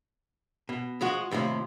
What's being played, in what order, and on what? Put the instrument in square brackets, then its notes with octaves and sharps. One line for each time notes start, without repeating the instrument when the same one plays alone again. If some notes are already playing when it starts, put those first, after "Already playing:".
[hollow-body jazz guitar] B2
F3 G#3 F#4
D#2 A2 C3 F3